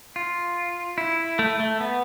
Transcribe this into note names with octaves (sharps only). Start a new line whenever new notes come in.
F4
E4
A3
A3
B3